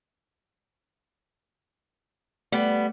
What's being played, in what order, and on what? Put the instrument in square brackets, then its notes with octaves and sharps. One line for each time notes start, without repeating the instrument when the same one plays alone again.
[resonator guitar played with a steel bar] G3 B3 [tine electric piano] A3